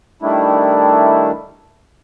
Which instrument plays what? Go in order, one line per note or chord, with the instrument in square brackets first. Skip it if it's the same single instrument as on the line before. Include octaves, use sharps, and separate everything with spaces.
[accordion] D#3 G3 A3 D4 E4